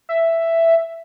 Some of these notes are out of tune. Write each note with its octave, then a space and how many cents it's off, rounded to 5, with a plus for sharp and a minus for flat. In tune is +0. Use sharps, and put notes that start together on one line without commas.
E5 +5